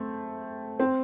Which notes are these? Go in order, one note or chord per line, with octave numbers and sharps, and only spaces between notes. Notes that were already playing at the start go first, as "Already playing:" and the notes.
Already playing: A3 C4
C4